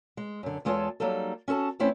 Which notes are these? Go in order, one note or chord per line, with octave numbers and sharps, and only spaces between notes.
G#3
F#2 D3
E2 G#3 F4 A4 C#5 A5
F#3 G3 A#3 D#4 A4
C#4 F#4 A4 A5
E2 A3 C4 C#4 E4 C#5